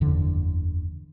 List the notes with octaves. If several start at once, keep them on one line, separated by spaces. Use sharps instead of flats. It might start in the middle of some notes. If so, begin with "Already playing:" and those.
F#1 E2 D3 F3